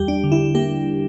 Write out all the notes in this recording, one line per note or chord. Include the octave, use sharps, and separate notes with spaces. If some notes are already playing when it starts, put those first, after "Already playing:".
Already playing: E2 G3 G4
D4
D3
E4
A#3 G4